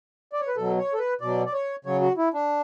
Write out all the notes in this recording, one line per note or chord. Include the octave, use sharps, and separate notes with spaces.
D5
C#5
B4
B2 F#3 A4
C#5
A4
B4
B2 F#3 D5
D5
C#5
C#3 F#3 C#5
F#4
E4
D4